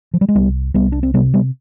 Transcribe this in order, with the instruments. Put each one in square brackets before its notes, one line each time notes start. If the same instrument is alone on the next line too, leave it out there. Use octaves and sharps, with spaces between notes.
[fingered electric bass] F3
G3
G#3
C2 G3 B3
C2 G3 B3
D4
C4
C3 G3 B3
G3 B3